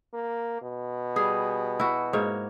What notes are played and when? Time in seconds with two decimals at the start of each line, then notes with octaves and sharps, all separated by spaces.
0.14 A#3
0.62 B2
1.16 G3 G#4
1.80 E4 F#4
2.13 G#2 A#3 C#5